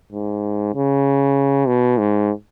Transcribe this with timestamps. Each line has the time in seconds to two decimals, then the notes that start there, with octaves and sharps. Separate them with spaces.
0.12 G#2
0.74 C#3
1.67 B2
1.98 G#2